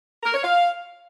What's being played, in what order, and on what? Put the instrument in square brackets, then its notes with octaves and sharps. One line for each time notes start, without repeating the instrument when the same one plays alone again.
[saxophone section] A#4
C#5
F5